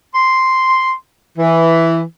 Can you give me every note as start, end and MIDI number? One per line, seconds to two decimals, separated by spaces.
0.14 0.91 84
1.38 2.00 52